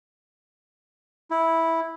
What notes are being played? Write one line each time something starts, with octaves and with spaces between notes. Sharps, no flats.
E4